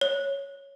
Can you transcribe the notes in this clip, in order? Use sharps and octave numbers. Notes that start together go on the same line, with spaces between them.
C#5